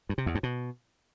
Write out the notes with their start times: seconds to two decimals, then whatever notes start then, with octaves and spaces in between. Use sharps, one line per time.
0.09 G2
0.18 C3
0.26 E2
0.35 G2
0.43 B2